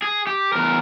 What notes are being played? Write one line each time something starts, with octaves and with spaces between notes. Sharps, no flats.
G#4
G4
E2 A#4